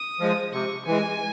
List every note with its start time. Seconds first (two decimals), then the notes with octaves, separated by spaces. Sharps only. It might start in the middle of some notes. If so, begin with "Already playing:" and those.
Already playing: D#6
0.20 F3 G#3
0.53 C3 C#6
0.86 E3 G#3 G#5